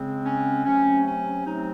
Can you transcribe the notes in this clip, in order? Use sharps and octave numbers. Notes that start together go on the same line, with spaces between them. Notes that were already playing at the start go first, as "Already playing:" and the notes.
Already playing: C#3 G#3 C4
C#4
C3 F#3 A3 C4 C#4
C#4
C3 F#3 A3 C4 D#4